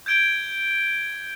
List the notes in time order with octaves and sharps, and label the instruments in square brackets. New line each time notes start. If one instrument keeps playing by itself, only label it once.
[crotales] G6 G#6 D7 G7